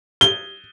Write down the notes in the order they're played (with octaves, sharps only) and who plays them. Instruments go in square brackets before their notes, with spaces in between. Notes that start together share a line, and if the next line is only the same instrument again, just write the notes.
[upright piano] G7